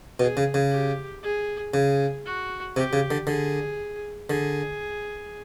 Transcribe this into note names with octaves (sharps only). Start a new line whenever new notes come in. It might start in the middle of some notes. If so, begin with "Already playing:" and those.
B2 G#4
C#3
C#3
G4
G#4
C#3 G#4
F#4
C3 G4
C#3
D3
D3 G#4
D3 G#4